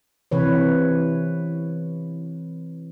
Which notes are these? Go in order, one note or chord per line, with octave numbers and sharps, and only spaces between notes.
C3 E3 B4 C#5